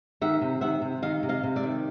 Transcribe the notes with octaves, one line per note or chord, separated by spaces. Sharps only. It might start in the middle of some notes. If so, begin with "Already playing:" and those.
D#3 E5 F#5
C3
D#3 E5 F#5
C3
D#3 D#5 F5
C3
D#5 F5
C3
D5 E5
D#3